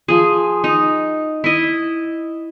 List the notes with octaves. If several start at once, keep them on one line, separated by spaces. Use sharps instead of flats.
F3 G#4
D#4
E4 D#5